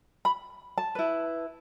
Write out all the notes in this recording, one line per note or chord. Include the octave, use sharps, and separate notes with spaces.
B5
A5
E4 B4